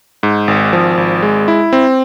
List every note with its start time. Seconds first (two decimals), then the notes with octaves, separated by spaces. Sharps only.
0.23 G#2
0.48 G#1
0.73 F3
0.97 G#1
1.22 G#3
1.48 E4
1.73 C4